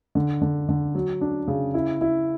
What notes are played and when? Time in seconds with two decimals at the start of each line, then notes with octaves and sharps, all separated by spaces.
0.15 D3
0.42 D3
0.69 D3
0.95 F#3
1.21 D4
1.48 C#3
1.74 E4
2.01 E4